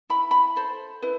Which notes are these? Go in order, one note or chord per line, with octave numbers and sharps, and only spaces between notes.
E4 B5
B5
A4 C5
E4 B4